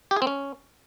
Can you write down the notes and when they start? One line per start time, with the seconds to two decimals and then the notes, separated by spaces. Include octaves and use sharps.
0.11 G4
0.16 G#4
0.22 C4
0.27 C#4